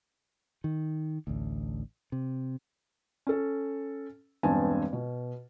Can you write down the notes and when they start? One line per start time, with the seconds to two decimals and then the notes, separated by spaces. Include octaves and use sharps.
0.64 D#3
1.27 A1 D2
2.12 C3
3.27 C#4 A4
4.43 E1 G2 B3 C4 G#5 A5
4.93 B2